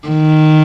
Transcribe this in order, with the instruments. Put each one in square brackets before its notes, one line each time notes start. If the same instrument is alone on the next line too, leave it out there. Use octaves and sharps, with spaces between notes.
[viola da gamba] D#3